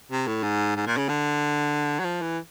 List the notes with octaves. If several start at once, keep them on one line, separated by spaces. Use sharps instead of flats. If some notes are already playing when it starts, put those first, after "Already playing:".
C3
A2
G#2
G#2
A#2
C#3
D3
F#3
F3
E3